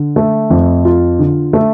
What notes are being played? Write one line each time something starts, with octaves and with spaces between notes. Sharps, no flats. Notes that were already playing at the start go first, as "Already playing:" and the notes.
Already playing: D3
A3
F2
F4
D3
A3